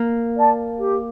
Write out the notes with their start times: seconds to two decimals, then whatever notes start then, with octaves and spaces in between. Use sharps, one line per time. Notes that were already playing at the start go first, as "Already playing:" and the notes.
Already playing: A#3
0.35 D5 A5
0.79 G4